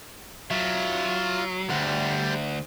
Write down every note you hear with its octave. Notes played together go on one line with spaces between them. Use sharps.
F#3 F4 E5
D2 G3 F#5